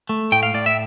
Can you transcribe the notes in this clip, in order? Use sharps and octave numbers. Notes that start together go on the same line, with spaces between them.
A3
A2 G5
F5
A2 D5
E5